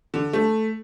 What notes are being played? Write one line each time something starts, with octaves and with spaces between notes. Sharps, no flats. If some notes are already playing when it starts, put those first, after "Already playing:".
D3
A3